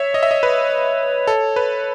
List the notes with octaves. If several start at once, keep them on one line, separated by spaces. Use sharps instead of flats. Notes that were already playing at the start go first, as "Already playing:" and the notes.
Already playing: C#5 E5
D#5
E5
D#5
B4
A4
B4